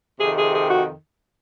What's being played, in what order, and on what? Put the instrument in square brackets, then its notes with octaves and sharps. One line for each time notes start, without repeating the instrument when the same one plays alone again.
[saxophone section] F2 C3 D#3 G#4
G#4
G#4
F#4